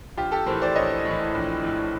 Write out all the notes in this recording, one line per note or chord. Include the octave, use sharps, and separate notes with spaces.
A#1 F4 G4
G4 A4
A2 E3 A#4 C5
C5 D5
A#1 C#5 D#5
A2 E3
A#1
A2 E3